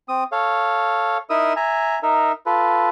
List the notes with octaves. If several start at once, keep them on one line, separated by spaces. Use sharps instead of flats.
C4 D#6
A4 C#5 F5
D#4 E4 A#4 D#6 E6
E5 G#5 A#5
D#4 A#4 E5
F4 A4 B4